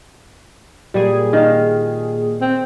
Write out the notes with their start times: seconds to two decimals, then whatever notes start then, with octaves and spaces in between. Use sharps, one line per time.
0.94 A#2 G3 G#4
1.33 D#3 F5
2.42 C4